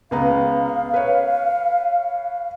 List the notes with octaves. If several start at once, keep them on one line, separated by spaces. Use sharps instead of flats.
C#2 B3 F5 A#5
B4 C#5